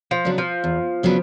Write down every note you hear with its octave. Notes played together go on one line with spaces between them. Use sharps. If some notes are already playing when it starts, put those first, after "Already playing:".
F3
C#3 F#3 B3 D4
F3
E2
C#3 F#3 B3 D4